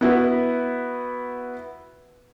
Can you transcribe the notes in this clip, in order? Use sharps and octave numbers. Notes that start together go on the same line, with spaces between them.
B3 E4 F#4 B4